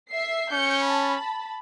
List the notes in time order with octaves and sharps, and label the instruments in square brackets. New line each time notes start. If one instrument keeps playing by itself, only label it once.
[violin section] E5 C7
[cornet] C#4 [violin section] G6 C#7
[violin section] A5 B5